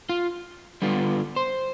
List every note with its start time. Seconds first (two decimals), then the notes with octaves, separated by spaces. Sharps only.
0.09 F4
0.82 D3 G3 B3 F4
1.36 C5